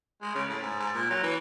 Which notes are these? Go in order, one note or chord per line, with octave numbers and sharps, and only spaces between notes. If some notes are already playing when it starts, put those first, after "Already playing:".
G#3
C#3
A2
G#2
G#2
A#2
F#3
E3